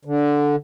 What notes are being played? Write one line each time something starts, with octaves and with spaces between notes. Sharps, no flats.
D3